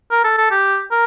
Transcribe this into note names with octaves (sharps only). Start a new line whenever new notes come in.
A#4
A4
A4
G4
A#4